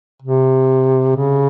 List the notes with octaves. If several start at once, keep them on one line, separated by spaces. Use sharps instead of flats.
C3
C#3